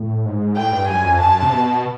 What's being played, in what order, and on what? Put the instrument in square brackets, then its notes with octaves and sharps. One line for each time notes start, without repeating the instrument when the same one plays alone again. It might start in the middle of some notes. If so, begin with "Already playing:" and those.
Already playing: [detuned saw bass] A2
G#2
[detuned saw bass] A2 [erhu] G5
[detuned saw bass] G2
[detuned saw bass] F#2 [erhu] G#5
[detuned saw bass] F2
[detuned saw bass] F#2 [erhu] A5
[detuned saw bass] C3
B2